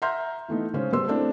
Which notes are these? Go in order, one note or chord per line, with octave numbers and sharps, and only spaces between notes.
E5 F#5 A#5 C6 F6 G6
E3 A3 B3 D#4
C#3 G#3 C#4 C5 C#5
G3 B3 B4 C5 C6 E6
A3 A#3 C4 D4 E4